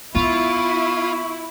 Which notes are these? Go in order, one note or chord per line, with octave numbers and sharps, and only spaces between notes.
B3 E4 F4 C#6